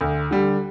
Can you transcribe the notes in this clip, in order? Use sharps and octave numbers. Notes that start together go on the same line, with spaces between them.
D2
D3 G3